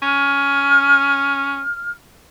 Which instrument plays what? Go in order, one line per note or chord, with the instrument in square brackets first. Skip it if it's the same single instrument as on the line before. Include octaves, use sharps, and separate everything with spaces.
[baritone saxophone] C#4 [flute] F6